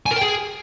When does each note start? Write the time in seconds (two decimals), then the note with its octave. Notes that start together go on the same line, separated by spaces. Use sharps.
0.06 G#5
0.11 A#4
0.16 G5
0.21 G#4